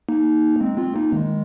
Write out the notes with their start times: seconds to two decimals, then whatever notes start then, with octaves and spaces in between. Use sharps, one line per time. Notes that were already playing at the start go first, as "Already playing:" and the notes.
0.09 A#3 D#4
0.61 G#3 C4
0.78 C4 F4
0.96 A#3 D#4
1.12 D#3 G#3